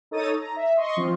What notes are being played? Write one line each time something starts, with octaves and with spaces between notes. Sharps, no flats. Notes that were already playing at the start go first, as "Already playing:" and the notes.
D#4 A4 C#5 D#6 A6 D#7
A#5
E5
D#5 C6 C#6
F3 C4 F4